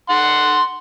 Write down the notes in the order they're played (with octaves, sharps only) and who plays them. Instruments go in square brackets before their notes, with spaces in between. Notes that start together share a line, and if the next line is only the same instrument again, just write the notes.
[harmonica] F#5 C6